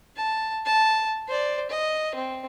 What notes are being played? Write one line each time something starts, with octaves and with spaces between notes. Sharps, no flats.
A5
A5
C5 D5
D#5
C4